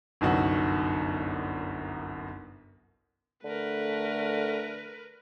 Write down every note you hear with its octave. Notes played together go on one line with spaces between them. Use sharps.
G1 C2 F#2 D#4 F#4 F#5
D3 A3 A#4 B4